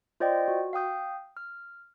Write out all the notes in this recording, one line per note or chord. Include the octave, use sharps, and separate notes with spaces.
F4 C5 D5 D#5 G5
F#4
F5 G5 D#6 G6
F6